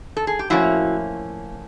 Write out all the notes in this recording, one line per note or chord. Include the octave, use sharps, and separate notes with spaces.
A4
G#4
G4
A2 F3 A#3 C#4 E4 F#4